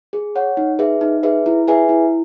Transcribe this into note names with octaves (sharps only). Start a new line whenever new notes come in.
G#4
C#5 F#5
D#4
G#4 B4 E5
D#4
G#4 B4 E5
E4
G#4 B4 E5 G#5
E4